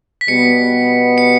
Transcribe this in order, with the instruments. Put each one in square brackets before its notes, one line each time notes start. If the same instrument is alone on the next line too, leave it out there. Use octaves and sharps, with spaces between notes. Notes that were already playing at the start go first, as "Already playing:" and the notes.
[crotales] B6
[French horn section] B2 G3 B3 [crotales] C#7
[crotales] C#7